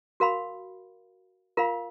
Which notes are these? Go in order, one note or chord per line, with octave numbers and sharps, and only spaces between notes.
F#4 A#4 F5 B5
F4 A#4 F5 B5